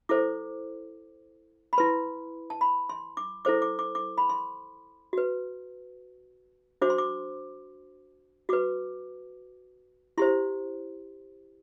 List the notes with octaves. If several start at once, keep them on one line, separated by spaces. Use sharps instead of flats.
E4 A4 C5 D6
B5
E4 B4 C6
A5
B5
C6
D6
E4 A4 C5 D6
D6
D6
D6
B5
C6
F#4 B4
D4 F#4 C5 D6
C6
D6
F#4 B4 D6
E4 G4 C5 C6